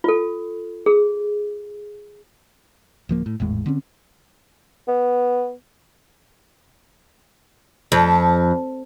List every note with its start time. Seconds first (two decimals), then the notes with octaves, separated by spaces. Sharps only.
0.04 F4 A4
0.86 G#4
3.09 D1 F3 A#3
3.26 A2
3.40 G#1 E2 A2 G#3
3.66 D3 C4 C#4
4.88 B3
7.92 F2